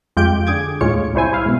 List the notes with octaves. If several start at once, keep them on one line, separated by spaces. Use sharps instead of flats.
F2 G#3 F4 G4 G6 D7
D3 G#4 D6 G#6
D#2 A2 G#3 F4 C#5 C#7
C2 G3 E4 C5 G#5
E4 F5
G#2 B2